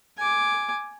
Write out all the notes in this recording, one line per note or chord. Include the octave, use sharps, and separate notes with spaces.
G#5 D6